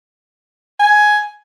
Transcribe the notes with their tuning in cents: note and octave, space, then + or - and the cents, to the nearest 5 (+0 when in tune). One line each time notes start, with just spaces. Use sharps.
G#5 +10